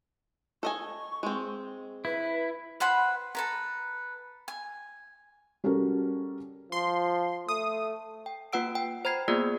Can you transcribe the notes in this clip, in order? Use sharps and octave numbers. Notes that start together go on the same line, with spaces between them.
A4 D#5 G#5 C#6
G#3 C4
E4 B4
B4 C5 F#5 B5
A4 B4 A#5
G#5
G3 C#4 F#4 A4 A#4
F3 C6
A3 D#6
G5
A#3 F4 B4 F#5 E6 D7
G5
C5 A#5 B5 G#6 C7
A#3 B3 F4 G#4 D5 G#6